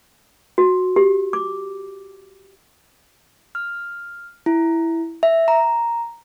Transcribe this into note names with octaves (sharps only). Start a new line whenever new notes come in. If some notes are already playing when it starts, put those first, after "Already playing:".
F#4
G4
D6
F6
E4
E5
A#5